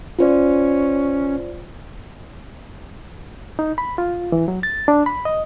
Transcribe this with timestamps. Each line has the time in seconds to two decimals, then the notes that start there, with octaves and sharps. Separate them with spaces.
0.19 C#4 F4 C5 D5
3.59 D#4
3.78 B5
3.98 F4
4.32 E3
4.48 F#3
4.63 A6
4.88 D4
5.06 B5
5.25 D#5